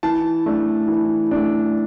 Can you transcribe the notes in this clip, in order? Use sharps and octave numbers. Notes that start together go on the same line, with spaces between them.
E3 A5
A3 D4
E3
A3 D4